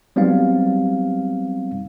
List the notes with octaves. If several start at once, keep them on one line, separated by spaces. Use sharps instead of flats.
F#3 G3 B3 C4 D#4 F5